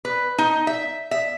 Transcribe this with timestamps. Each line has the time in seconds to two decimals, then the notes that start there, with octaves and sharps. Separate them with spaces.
0.05 B4
0.38 D#4
0.67 E5
1.11 E5